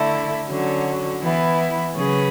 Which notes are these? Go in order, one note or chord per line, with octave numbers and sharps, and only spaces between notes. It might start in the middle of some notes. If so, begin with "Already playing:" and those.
Already playing: D3 A3 E4
D3 F#3 C#4 F#4
E3 B3 E4
C#3 F#3 C#4 G#4 B4